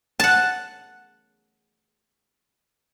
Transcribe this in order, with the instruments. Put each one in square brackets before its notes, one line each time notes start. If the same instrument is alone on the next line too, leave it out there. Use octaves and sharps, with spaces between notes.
[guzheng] F#5 A5